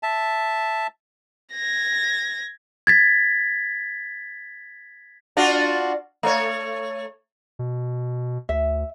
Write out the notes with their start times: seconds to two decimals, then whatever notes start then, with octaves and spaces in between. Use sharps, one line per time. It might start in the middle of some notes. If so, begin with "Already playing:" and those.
0.03 E5 A5
1.54 G#6 A#6
2.87 G#6 A6 B6
5.37 D4 F4 F#4
6.23 A3 C#5
7.59 B2
8.49 D2 E5